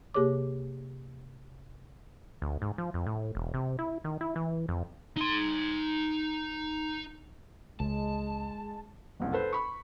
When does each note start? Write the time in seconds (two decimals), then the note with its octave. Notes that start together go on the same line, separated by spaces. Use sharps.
0.14 C3 A#3 G4 G#4 C#5 D6
2.42 D2
2.62 G#2
2.78 F3
2.94 F2
3.06 A2
3.35 E1
3.54 C3
3.79 E4
4.04 D#3
4.21 E4
4.36 E3
4.69 F2
5.17 D#4 C6
7.80 C#2 G#3 A5
9.20 F#1 C2
9.33 A4 B4 C5
9.53 B5 C#6